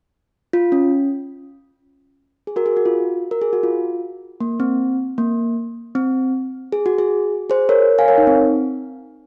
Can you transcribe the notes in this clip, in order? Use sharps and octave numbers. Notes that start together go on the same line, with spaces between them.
F4
C#4
G#4
F#4 A#4
G#4
F#4
F4
A#4
G#4
F#4
F4
A#3
C4
A#3
C4
G#4
F#4
G#4
G#4 C5
A#4 C#5
F5 G#5
A#4 C#5
D#4
C4